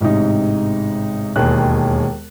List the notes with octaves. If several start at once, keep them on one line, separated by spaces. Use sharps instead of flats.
A1 G#2 C3 D#4
E1 D#2 D#3 G#4 F#6